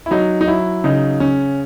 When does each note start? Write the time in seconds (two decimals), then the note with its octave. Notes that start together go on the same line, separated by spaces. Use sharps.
0.06 E4
0.11 F#3 D#4
0.41 D#4
0.47 F#3 E4
0.84 C#3 D#4
1.20 C#3 C#4